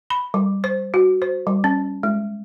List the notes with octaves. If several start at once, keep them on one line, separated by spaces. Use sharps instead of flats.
B5
G3
C5
F#4
C5
G3
C#4
G#3